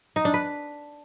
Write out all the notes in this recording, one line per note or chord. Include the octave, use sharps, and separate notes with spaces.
D#4
D4
B4